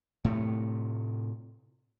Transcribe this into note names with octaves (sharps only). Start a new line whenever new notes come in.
A2 C3 A3